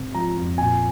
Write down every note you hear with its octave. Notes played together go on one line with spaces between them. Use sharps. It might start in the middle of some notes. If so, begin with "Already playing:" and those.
Already playing: G#2 C3 C4
F3 A#5
F2
A#2 G#5